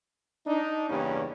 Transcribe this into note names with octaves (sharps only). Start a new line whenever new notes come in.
D4 D#4
E2 G2 C#3 G3 A#3 C#4